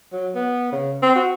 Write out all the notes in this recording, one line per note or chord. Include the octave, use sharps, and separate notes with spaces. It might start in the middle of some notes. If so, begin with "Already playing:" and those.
F#3
B3
C#3
C4
F#4